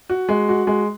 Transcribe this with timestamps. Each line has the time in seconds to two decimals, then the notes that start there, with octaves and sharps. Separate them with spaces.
0.09 F#4
0.29 G#3
0.49 F#4
0.67 G#3